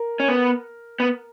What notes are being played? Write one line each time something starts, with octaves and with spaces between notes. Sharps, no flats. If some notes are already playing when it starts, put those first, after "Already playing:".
Already playing: A#4
C#4
B3
B3